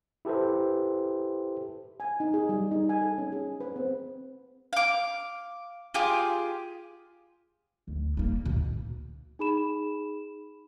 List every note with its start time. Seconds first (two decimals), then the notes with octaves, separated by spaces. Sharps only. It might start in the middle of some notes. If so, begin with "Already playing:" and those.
0.25 E4 G4 A4 B4 C5
2.00 G#5
2.20 D#4
2.34 G#4
2.49 G3
2.71 D#4
2.89 G#5
3.02 A4
3.18 C#4
3.32 G#4
3.60 B4
3.76 C4
4.73 F5 D6
5.94 F4 G4 G#4
7.88 D2
8.17 G3 A#3
8.46 D2 B2
9.39 D#4 G#4 B5 E7